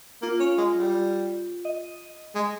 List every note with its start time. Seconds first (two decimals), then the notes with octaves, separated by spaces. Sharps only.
0.22 A#3 F4
0.40 C#4
0.58 G#3
0.76 G3
1.65 D#5
2.35 G#3